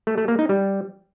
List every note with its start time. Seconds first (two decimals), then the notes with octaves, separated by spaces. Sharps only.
0.07 A3
0.18 A3
0.28 A#3
0.39 D#4
0.49 G3